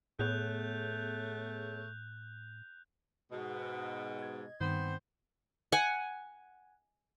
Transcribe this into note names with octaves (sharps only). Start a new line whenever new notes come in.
A2 A3 B3 G#4 C#5 F#6 G6 F7
G#2 B2
D#5 G#6
G2 D#3 B3 C4 C5 G6
F#5 G#5